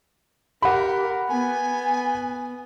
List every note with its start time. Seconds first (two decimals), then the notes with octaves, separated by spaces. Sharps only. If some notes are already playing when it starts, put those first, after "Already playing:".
0.62 G4 A#4 F#5 B5
1.29 B3 G#5